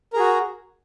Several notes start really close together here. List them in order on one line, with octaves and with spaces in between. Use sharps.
A#4 G#4 F#4